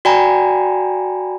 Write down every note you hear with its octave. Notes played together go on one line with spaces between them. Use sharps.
F#4 D5 G5 G#5 A#5 B5